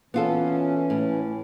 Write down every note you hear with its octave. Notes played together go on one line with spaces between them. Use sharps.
E3 B3 C#4 F4 A4
A2